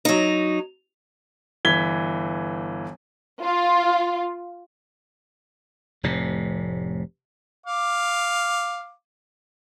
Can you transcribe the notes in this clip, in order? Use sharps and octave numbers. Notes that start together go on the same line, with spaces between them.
F#3 D#4
G1 E3 G#6 B6 G7
F4
F1 A2 C3
F5 D6